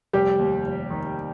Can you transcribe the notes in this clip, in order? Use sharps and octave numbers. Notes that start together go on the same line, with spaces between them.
F1 G3 G4
D#2
F1
D#3